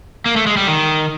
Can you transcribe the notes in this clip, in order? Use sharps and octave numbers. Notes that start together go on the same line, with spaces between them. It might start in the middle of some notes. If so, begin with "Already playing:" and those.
A#3
A3
G#3
G3
D#3